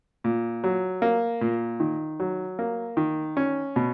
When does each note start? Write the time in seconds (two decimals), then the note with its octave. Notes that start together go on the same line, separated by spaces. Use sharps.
0.24 A#2
0.64 F#3
1.02 A#3
1.41 A#2
1.80 D#3
2.20 F#3
2.59 A#3
2.97 D#3
3.37 C#4
3.76 B2